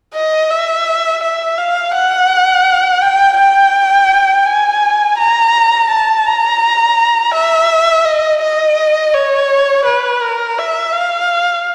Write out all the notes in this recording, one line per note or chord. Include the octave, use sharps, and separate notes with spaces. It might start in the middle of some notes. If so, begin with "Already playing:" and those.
D#5
E5
E5
F5
F#5
G5
G5
G#5
A#5
A5
A#5
E5
D#5
D#5
C#5
B4
A#4
E5
F5